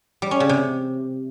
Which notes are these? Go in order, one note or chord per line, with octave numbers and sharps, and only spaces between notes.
G3
C#4
C#3
C3